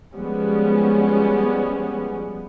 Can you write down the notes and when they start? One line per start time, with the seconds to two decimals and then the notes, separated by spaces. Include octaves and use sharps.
0.17 F3 G3 G#3 B3 C#4